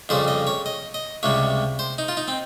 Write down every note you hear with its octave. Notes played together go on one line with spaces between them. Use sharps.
F2 C#3 G3 C5
D#5
C#5
D#5
D#5
C#2 C3 G3 C#5
C5
D#4
F4
D#4
C4